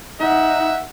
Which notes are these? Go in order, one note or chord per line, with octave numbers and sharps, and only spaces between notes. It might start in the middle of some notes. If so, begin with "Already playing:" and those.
D#4 E5 F#5